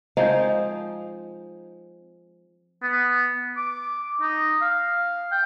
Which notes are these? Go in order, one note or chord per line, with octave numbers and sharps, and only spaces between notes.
F3 G#3 C4 D#4
B3
D6
D#4
F5
G5